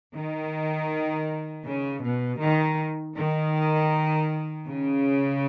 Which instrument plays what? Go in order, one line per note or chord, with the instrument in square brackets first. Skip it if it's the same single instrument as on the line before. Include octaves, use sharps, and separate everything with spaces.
[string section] D#3
C#3
B2
D#3
D#3
C#3